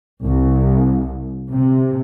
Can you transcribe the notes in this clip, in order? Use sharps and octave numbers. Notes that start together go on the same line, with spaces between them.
C2
C3